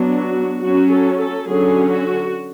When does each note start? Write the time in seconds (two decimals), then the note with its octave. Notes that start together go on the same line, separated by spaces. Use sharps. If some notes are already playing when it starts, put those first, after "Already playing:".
Already playing: F#3 B3 D4
0.19 F#4
0.62 F#3 C#4 F#4
0.91 A4
1.19 A4
1.47 D3 F#3 C#4 G#4
1.90 F#4